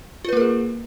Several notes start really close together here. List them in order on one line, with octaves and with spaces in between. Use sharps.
F4 B4 A#3 A#4 G#4